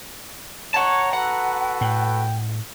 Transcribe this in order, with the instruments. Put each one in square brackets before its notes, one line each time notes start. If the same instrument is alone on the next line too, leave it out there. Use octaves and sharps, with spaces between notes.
[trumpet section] C#5 [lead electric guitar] F#5 A5 [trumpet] A#5
[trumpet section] F#4 A4 B4 [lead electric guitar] F#5
[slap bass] A2 [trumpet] G5